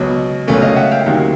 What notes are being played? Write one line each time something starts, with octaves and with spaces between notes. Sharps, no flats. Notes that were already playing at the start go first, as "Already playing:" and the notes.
Already playing: C#2 B2 F#3
C#2 B2 F#3 A3 C#4
D#5 F5
E5 F#5
F5 G5
D2 C3 D#3 F#3 A#3